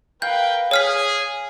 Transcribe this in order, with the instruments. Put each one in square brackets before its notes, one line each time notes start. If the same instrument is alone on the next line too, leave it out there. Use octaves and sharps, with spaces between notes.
[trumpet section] A#4 B4 G5 [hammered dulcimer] F5 [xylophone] G6
[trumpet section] G#4 [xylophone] C#5 F6 B6